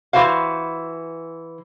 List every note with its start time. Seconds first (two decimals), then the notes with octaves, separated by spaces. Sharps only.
0.13 E3 F#4 C5 F5